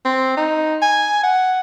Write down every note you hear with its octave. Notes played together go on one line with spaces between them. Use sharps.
C4
D#4
G#5
F#5